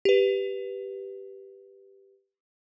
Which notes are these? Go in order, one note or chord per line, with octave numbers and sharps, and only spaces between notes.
G4 B4